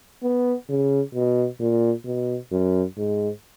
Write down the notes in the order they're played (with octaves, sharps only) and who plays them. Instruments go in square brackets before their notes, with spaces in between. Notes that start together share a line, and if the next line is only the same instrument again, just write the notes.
[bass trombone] B3
C#3
B2
A#2
B2
F#2
G#2